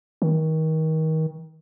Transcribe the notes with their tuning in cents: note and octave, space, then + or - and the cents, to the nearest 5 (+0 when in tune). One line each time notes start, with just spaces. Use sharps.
D#3 +30